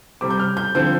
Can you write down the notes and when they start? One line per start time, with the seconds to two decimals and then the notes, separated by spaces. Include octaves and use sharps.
0.21 C3 G3 C4 D6
0.30 G6
0.40 F6
0.57 G6
0.75 D3 F3 C4 G6